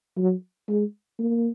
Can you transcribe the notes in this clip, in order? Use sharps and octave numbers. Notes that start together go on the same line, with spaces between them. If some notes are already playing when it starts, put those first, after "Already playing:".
F#3
G#3
A#3